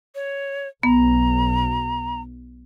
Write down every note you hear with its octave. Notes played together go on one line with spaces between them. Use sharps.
C#5
B1 B3 A#5